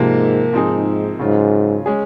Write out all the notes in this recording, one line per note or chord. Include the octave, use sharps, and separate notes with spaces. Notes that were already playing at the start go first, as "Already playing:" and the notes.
Already playing: G#2 C3 F3 A#3
G#2 F3 C4 D#4 G#4
G#2 C#3 F#3 C#4 F4
G#3 C#4 G#4